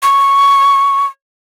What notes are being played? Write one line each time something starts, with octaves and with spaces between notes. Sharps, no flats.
C#6